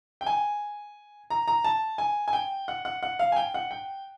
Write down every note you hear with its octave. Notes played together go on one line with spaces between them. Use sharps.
G5
G#5
A#5
A#5
A5
G#5
G#5
G5
F#5
F#5
F#5
F5
G#5
G5
F#5
G5